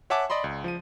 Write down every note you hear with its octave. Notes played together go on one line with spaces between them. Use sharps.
C#5 E5 F#5 G#5 A5 D6
D5 D#5 B5 C6
C#2
F3 D#7